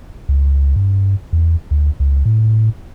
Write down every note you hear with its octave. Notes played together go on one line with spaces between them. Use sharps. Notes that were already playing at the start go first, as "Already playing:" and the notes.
C#2
G2
E2
D2
C#2
A2